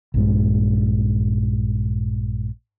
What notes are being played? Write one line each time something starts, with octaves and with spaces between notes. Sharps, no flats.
A#1 G2 G#3